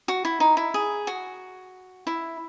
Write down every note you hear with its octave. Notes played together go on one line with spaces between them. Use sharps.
F#4
E4
D#4
E4
G#4
F#4
E4